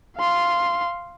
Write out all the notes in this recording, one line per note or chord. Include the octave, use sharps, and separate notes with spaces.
F5 C6